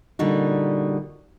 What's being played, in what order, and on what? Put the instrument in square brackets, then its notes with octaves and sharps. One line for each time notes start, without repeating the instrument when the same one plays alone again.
[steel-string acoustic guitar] A#2 D3 G3 D#4 F#4